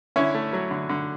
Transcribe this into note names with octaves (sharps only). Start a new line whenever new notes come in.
D3 C#4 E4
A3
F#3
D3
D3